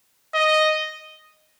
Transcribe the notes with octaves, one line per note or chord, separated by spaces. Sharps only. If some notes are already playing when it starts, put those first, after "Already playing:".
D#5